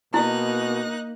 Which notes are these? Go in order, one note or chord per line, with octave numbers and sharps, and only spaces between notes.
B2 A#3 D#4 E4 F#6